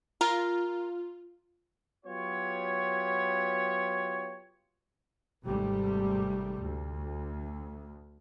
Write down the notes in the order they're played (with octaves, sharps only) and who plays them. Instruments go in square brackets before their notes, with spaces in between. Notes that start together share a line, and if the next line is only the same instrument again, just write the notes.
[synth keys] F4 [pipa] A#4
[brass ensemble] F#3 B3 F4 G4 C#5
[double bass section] G#1 G#2 C3 G3 A3
D2